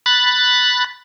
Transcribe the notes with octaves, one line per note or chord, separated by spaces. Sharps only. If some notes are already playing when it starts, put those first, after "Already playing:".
B5 F#6 A6